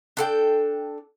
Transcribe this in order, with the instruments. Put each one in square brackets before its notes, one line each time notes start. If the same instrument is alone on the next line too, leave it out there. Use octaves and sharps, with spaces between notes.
[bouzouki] D4 A4 G5